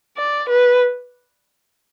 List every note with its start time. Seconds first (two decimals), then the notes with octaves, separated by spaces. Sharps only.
0.17 D5
0.49 B4